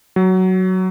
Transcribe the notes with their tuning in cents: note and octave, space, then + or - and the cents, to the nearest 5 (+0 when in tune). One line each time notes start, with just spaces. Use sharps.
F#3 +10